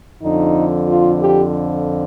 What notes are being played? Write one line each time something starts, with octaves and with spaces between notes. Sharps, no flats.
F2 D3 F3 D#4
F4
G4